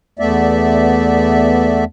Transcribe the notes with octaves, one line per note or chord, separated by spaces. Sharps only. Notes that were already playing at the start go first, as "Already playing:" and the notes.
E2 A3 B3 D5 E5